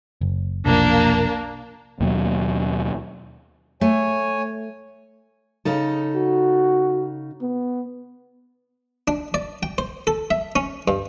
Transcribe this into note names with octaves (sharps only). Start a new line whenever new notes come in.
F#1
F1 B1 F3 A#3 D4
D#2 B2 F#3
A3 C#5 G#5
C#3 D#4 A4
F#4
B3
D4
D5
G5
C5
A4
E5
C#4
G2